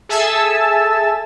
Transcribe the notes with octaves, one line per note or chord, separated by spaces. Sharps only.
G#4 A4 E5 G#5 A5 E6